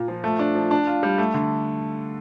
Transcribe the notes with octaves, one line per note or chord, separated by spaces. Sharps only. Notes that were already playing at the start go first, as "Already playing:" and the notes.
Already playing: A#2
F3
A3
D4
F3
D4
F4
G3
A3
D3